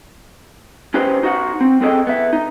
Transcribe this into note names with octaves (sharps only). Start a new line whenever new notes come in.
C#4 D#4 G4 B4 C5
D#4 F#4 F#5
C4
C4 G#4 A4 C5 D#5 G5
B3 E5
D#4